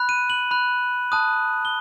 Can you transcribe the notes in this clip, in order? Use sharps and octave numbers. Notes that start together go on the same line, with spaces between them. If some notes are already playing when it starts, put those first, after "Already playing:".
Already playing: B5 F#6
D#7
F#7
B5 F#6
A5 D#6 F#6
G7